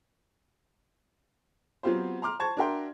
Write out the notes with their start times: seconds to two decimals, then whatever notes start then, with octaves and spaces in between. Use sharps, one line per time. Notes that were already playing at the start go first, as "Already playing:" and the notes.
1.83 F#3 B3 C4 F4 G4 C5
2.22 A#5 C6 D6 F6
2.39 C5 A5 C#6 G#6
2.57 D4 F#4 A#4 E5 G5 C6